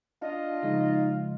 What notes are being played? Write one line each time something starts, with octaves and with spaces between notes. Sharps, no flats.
D4 F4 D#5
C#3 F3 G#3 D#4